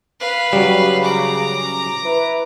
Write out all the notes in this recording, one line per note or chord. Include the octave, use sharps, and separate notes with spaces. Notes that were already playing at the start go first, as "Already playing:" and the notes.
B4 F5
C#3 F#3 G3
A#5 D6
E4 B4